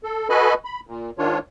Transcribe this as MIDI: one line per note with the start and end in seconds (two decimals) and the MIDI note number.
0.04 0.28 69
0.30 0.54 66
0.30 0.54 69
0.30 0.54 71
0.30 0.54 75
0.30 0.54 80
0.30 0.54 83
0.65 0.80 83
0.87 1.10 46
1.18 1.38 44
1.18 1.38 51
1.18 1.38 62
1.18 1.38 65
1.18 1.38 73